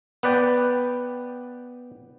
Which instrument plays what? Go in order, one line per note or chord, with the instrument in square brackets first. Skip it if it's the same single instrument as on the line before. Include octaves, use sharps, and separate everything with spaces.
[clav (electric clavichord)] B3 B4 D5 G5